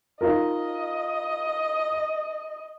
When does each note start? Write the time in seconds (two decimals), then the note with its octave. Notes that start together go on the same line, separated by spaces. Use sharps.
0.21 D#4 F4 A#4 D#5